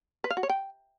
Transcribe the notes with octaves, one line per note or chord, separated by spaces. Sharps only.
B4
F5
F#4
C#5
G5